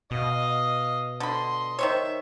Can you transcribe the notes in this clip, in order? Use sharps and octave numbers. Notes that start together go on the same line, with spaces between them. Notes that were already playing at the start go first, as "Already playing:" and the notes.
B2 D#5 F5
D3 D#5 B5 C6
D#3 C5 C#5 E5